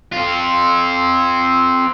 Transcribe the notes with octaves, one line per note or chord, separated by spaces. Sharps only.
C4 F4